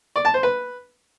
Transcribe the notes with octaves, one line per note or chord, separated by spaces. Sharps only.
D5
A5
C5
B4